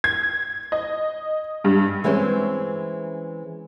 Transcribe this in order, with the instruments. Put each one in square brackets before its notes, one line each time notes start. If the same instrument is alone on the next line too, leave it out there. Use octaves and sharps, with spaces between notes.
[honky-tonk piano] G#6
D#5
G2
[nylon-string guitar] E3 G#3 C4 C#4 C5